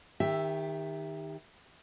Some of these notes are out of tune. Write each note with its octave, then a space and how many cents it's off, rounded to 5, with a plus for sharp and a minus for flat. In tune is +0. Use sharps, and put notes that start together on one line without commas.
D#3 +0 G4 +25 E5 +0